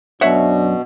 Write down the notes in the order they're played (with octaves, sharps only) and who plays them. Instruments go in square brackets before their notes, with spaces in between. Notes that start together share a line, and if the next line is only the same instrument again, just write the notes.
[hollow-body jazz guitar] F#2 C#5 [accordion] B2 [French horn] D4 [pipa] E5 F#5